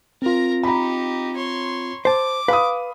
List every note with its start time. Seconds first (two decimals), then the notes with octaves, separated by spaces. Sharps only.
0.22 C4 F4 A#4 A#5
0.63 D#4 G4 A#5 B5
1.35 C#5 C6
2.05 C5 A5 D6
2.48 B4 F5 B5 D#6